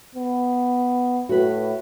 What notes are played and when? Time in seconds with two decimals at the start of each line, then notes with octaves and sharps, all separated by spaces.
0.15 B3
1.29 A2 F#4 B4